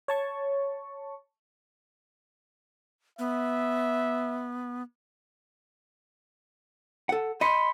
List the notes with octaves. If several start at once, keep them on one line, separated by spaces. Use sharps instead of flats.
C#5 A5 C#6
B3 E5
A4 F#5
D#5 B5 C6 B6 C#7